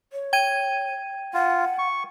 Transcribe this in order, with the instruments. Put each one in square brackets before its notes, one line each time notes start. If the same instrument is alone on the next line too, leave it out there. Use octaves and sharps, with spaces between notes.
[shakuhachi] C#5
[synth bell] G5 G#6 D#7
[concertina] F4 [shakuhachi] F#5
[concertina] C#6